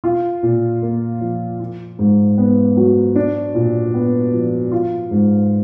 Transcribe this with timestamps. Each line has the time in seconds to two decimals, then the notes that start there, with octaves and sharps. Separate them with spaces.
0.04 F4
0.43 A#2
0.82 A#3
1.21 F3
1.60 F4
1.99 G#2
2.38 B3
2.77 F#3
3.16 D4
3.55 A#2
3.94 B3
4.33 F3
4.72 F4
5.11 G#2